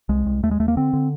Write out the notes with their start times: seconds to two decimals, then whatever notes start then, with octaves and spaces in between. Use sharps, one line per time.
0.09 C2 G#3
0.26 C2
0.43 D#2 A3
0.51 G#3
0.60 D#2 A3
0.68 A#3
0.77 D3 C4
0.93 D3